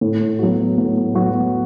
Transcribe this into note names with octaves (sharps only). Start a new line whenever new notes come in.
A2
F#3 B3 F#4
A2
F#3 B3 F#4